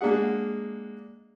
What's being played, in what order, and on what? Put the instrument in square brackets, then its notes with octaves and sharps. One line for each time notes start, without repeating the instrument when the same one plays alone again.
[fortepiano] G#3 A#3 D4 G#4 F#5